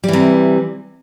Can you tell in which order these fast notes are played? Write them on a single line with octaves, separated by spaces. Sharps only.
G3 E3 C3